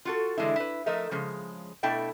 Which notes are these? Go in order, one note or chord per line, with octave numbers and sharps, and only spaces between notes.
F4 F#4 A4
D3 E3 G#3 D4 E4
E4 B4
F3 A3 A#4 D#5 E5
C#3 F3 G#3
B2 A3 D4 E4 G5 A5